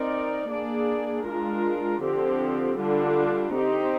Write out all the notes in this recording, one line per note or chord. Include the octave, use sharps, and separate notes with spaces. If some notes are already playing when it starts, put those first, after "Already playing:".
Already playing: C4 D#4 A#4 D5
A#3 D4 G#4 D5
G#3 D4 F4 A#4
D3 F3 C4 G4
D3 G3 D4 F4
C4 D#4 G4